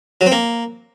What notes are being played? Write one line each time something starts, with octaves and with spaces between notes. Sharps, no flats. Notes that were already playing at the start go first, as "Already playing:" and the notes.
F#3
C4
A#3